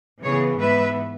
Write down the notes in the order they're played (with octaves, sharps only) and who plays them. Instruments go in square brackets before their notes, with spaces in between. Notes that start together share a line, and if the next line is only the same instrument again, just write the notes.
[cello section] C#3 E3 B3 G#4 C#5
G#2 E3 B3 B4 E5